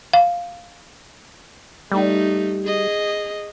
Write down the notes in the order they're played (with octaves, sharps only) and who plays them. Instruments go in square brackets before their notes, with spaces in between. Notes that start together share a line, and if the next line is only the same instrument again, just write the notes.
[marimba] F5
[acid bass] G3 [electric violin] A3 D#4
[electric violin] G#4 D#5